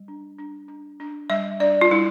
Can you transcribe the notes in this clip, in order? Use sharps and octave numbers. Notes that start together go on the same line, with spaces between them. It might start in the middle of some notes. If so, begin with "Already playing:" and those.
Already playing: G3
D4
D4
D4
D4
G3 E5
D4 D5
F4
G3 E4